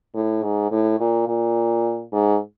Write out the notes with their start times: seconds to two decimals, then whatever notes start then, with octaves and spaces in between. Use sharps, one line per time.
0.15 A2
0.44 G#2
0.71 A2
1.00 A#2
1.28 A#2
2.12 G#2